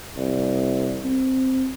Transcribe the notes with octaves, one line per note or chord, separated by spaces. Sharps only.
C2
C4